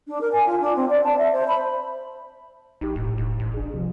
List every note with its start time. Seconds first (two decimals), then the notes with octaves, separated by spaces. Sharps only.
0.07 D4
0.21 A#4
0.32 G#5
0.46 F4
0.61 D4
0.76 C4
0.90 D5
1.04 A5
1.18 E5
1.33 C5
1.48 B5
2.81 A#1 D#4 G4
2.96 E1 A2
3.18 E1
3.40 A1
3.54 D4 G#4
3.73 C2 C3 F3